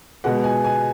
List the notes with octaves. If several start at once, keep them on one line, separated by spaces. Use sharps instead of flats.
B2 G#3 B3 F#5
G#5
G#5